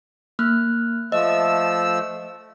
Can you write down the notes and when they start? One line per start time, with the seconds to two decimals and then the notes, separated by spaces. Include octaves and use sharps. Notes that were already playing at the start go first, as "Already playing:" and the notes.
0.39 A#3 F6 F#6
1.12 F3 A3 D#5 E6